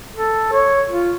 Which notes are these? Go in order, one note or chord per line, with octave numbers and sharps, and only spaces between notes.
A4
C#5
F4